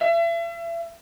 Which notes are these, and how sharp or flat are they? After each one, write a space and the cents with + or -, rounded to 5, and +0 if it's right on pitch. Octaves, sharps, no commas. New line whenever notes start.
E5 +40